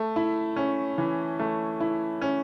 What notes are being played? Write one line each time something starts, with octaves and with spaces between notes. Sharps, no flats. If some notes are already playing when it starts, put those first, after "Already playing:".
Already playing: A3
E4
C#4
E3
A3
E4
C#4